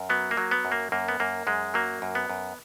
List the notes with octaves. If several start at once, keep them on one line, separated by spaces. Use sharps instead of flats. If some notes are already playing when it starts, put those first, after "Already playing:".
Already playing: F#2
F#3 B3
A#3
F#3
B3
F#2
A#3
F#2 A#3
B3
F#2 A#3
F#2 G#3
F#3 A#3
F#2
B3
F#2